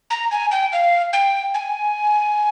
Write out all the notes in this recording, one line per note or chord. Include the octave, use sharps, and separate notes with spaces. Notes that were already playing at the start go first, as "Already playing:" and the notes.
A#5
G#5
G5
F5
G5
G#5